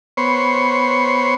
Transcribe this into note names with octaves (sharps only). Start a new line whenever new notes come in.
B3 C5 C#5